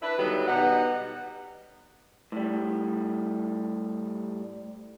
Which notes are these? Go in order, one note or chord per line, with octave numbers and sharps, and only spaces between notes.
D4 E4 B4
D3 D#3 F#3 G3 B3
B2 G3 D#4 F#5
A2 G3